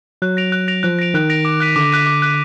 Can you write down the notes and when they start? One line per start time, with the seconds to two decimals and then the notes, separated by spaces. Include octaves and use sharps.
0.22 F#3 F#6
0.37 A#6 D7 F7
0.52 F#6
0.68 A#6 D7 F7
0.83 F3 F#6
0.99 A#6 D7 F7
1.14 D#3 F#6
1.30 A#6 D7 F7
1.45 D6
1.60 F#6 B6 D#7
1.76 D3 D6
1.92 F#6 B6 D#7
2.06 D6
2.22 F#6 B6 D#7